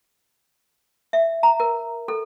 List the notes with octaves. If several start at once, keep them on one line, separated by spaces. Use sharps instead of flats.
E5
A#5
A#4
A4